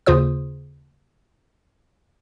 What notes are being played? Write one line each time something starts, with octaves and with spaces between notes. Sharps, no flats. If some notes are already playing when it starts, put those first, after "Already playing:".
D#2 C#3 F4 C5 D#6